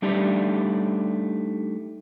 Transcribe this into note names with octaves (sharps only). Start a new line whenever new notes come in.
G3 A3 D4 D#4 G4 D5